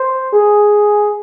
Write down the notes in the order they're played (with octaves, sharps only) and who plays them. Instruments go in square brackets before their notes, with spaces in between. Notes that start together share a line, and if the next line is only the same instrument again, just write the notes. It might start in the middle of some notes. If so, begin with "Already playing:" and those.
Already playing: [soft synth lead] C5
G#4